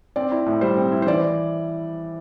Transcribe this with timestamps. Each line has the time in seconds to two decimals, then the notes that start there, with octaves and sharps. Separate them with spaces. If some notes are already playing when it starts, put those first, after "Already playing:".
0.16 C4 D5
0.32 E4
0.46 A2
0.61 G3 C5
0.77 C4
0.92 E4
1.02 C5
1.07 E3 D5